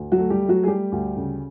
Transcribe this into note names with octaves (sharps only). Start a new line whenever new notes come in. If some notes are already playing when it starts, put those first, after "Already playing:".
Already playing: D2
F#3 F#4
A3
G3 G4
A3
F#3 F#4
G#4
G3 A3 G4
D2
C#3